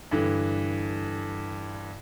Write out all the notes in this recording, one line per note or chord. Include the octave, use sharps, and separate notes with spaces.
G2 D3 E3